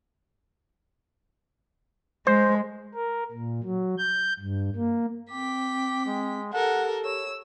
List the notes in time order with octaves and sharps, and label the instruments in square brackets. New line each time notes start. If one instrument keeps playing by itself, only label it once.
[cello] G#3 [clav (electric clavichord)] C5
[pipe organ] A#4
A#2
F#3
G6
G2
A#3
[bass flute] C4 [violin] G5 B6 [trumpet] D6
[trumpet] G#3
[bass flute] G4 [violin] A4 A#4 [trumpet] F#5
[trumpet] C#5 [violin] E6